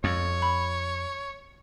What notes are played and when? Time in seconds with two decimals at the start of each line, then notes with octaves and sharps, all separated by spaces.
0.04 F2 C#5
0.42 B5